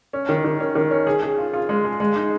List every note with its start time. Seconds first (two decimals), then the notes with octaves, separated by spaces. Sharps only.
0.13 C#4
0.29 D#3
0.45 D#3
0.60 C#4
0.75 D#3
0.91 C#4
1.07 G#4
1.23 G#4
1.38 F4
1.53 F4
1.69 G#3
1.84 G#4
2.00 G#3
2.16 D#4